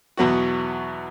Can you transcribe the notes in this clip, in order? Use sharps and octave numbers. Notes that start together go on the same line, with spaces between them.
E2 B2 F#3 B3 F#4